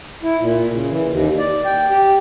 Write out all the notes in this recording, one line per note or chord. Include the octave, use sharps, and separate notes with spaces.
E4
A#2
C#3
E3
D#2
D5
G5
G4